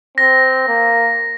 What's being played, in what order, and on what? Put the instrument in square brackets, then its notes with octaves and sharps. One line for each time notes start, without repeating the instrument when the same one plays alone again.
[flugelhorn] C4 [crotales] A#6
[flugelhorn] A#3